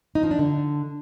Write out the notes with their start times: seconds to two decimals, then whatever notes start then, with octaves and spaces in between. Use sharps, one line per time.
0.15 D#4
0.23 F3
0.31 D4
0.39 D3